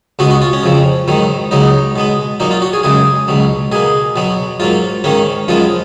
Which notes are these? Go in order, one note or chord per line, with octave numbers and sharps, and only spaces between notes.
C#2 B2 G#3 B3 F#4
F#4
F4
C#4
F2 C#3 F3
G#2 D#3 F#3 B3
C#2 C#3 F#3 B3 D#4
B2 G#3 B3
A#2 F#3 A#3 D#4
F4
F#4
G#4
F#2 C#3 G#3 G#4
C#2 B2 F#3
B2 A#3 G#4
B2 F#3 B3
G#2 F#3 A#3 F4
G#2 D#3 A#3 C#4
F#2 F3 G#3 B3 F4